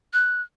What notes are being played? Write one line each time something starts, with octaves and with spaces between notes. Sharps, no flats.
F#6